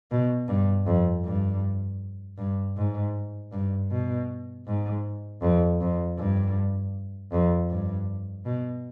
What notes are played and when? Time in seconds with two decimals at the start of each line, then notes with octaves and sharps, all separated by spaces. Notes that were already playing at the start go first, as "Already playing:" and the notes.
0.11 B2
0.48 G2
0.87 F2
1.25 G2
2.38 G2
2.77 G#2
3.52 G2
3.91 B2
4.67 G#2
5.42 F2
5.81 F2
6.19 G2
7.32 F2
7.70 G2
8.45 B2